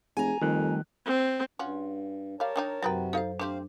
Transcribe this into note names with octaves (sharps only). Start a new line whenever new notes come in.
F1 G#4 G#5 A#5
F2 D#3 G3 A3 F#6
C4
G2 C#4 F4 F#4
G3 A#4 C#5 F5 A5
D#3 D4 D#4 G5
F#2 C3 D#3 F#3 F#4 B4 G5
D#4 A4 C5 F5
A3 C4 D4 G4 C5 F5